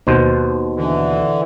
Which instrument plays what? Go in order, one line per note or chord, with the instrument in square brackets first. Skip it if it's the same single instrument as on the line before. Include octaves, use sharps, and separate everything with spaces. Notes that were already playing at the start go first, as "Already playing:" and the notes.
[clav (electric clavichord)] D#2 B2 C5
[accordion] D3 E3